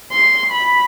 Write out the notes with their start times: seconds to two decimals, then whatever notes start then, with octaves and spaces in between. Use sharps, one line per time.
0.12 C6
0.51 B5